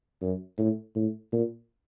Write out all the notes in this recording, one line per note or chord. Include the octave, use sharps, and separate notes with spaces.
F#2
A2
A2
A#2